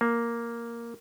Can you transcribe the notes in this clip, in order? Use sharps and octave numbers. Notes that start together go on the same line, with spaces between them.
A#3